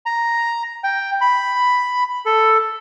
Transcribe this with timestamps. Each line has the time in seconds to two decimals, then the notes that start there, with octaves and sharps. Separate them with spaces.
0.06 A#5
0.84 G5
1.21 B5
2.26 A4